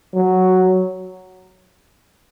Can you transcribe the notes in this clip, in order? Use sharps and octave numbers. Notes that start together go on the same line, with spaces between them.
F#3